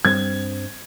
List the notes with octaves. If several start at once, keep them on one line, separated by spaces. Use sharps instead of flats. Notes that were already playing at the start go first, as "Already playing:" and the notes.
G2 G3 C4 G#6